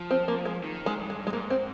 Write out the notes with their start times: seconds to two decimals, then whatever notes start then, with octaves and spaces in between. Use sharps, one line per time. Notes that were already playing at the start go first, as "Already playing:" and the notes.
Already playing: F3
0.11 C4
0.28 A#3
0.45 G#3
0.63 D#3
0.86 G#3
0.98 G2
1.10 G#3
1.27 G#3
1.33 G#2 A#3
1.50 C4